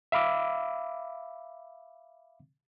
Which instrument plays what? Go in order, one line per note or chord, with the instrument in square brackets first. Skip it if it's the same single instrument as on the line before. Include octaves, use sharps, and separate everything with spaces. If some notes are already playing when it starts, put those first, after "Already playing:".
[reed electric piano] E5 F5 B5 D6 E6